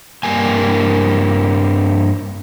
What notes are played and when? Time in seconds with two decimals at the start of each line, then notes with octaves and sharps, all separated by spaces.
0.23 G2 A#3 G#5